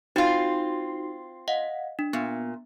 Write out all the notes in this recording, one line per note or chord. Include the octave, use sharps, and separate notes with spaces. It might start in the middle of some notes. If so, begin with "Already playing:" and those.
C4 D#4 F4 F#4
D#5 F5 F#5
D4
A#2 B3